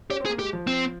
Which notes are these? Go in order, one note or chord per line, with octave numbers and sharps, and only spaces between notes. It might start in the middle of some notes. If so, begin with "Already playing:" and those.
C#4 G4
C4
G#4
A#3
G#3 G4
F3
C4